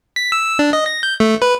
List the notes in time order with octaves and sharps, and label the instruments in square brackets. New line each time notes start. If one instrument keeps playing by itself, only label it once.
[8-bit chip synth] B6
E6
D4
D#5
A#6
G6
A3
B4